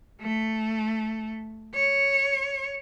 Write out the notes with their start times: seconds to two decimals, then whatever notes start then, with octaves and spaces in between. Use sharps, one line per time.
0.21 A3
1.75 C#5